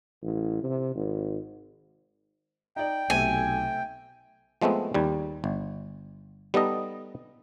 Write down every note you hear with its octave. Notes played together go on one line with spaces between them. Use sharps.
A1
C3
G#1
D#4 D5 G5
B1 C3 A3 G#5
F3 G#3 A3 B3 C4
D#2 G3
G1
G3 B3 D#4 A4 D#5